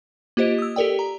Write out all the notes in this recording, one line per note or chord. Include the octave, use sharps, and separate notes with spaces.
A#3 F4 G4 C5 D#5 D7
D#6 E6
G4 A4 A#4 D5 G5
A#5